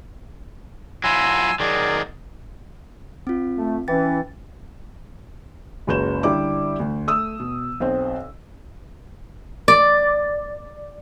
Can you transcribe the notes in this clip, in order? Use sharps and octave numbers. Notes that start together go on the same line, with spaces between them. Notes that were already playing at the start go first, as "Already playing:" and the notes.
F#3 E4 F4 G#5 C6 E6
D#3 F#3 G#4 D5
C4 F4
A3
E3 C#4 G5 A6
F#1 C#2 F#4 B4 G6 E7
D3 G3 E4 D6
D2
A3 D#6 E6
B2
B1 C4 C5
D5